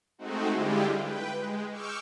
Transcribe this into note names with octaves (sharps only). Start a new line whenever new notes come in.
G#3 A3 C4 D#4 F#4
D3 G3 G#3 E4 F4 G4
B4 G5
G#3
C#6 D6 E6 F6 G6